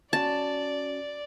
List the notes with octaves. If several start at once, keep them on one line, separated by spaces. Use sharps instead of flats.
C#4 F#4 D5 A5